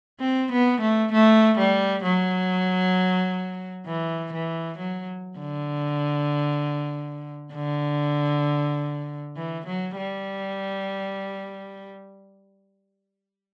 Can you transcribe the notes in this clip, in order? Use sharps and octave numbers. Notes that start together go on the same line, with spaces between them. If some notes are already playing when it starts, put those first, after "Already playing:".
C4
B3
A3
A3
G3
F#3
E3
E3
F#3
D3
D3
E3
F#3
G3